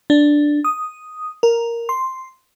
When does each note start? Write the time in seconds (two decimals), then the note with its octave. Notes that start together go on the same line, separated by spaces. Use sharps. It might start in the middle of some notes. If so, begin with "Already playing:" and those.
0.10 D4
0.64 D#6
1.43 A#4
1.89 C6